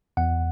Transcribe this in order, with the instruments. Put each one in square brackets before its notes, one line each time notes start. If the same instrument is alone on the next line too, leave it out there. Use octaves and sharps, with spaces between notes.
[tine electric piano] E2 F#5